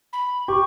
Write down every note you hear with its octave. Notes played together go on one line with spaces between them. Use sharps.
B5
G4 C#6